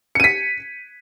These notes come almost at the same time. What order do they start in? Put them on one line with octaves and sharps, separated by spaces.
C#7 D#7 B6